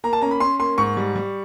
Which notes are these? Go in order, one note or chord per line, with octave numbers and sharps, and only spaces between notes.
A#3 A#5
A5
C#4 A#5
B5
C#4 C6
A#3 C6
G#2 C#6
G3
G3